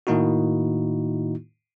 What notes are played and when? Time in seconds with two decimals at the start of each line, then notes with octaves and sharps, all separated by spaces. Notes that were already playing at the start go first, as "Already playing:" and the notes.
0.07 A2 D#3 A#3 D#4 E4 F#4